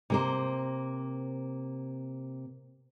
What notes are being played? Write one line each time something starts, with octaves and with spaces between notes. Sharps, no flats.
C3 A#3 C5